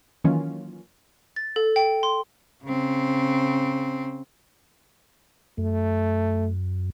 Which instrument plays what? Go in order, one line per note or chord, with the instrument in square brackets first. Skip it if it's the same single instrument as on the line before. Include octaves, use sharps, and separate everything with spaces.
[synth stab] D#3 E3 F#3 A#3 C#4 F4
[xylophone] A6
A4
G5
C6
[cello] C#3 C4
[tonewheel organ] F#2 [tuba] A3